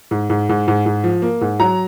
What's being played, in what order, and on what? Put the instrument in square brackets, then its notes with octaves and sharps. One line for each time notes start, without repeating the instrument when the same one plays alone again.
[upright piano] G#2
G#2
G#2
G#2
G#2
F3
A#3
G#2
F#3 A#5